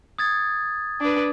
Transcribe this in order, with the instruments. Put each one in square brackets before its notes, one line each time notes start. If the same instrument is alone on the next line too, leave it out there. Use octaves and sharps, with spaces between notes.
[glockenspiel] D#6 G#6 A6
[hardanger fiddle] D4 B4